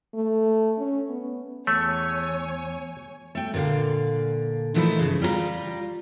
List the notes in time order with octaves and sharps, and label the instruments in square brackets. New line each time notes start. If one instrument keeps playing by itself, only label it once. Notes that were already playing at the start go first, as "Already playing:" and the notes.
[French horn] A3
C#4
B3
[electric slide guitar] E2 [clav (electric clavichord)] A3 [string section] C#5 G#5
[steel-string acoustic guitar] A3 G5
A#2 D3 F5
A#2 E3 F3 A3 D#4 E4
G2 C#3
G3 F4 A4 A#5